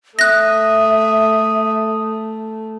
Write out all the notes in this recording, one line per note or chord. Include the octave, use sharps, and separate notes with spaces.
A3 E5 D#6 F#6 A#6